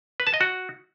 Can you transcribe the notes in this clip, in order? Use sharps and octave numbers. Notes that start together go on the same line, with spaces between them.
B4
A5
D#5
F#4